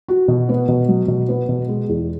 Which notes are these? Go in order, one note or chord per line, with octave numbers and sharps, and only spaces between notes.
F#4
B2
B3
B2
F#3
B2
B3
B2
G#3
E2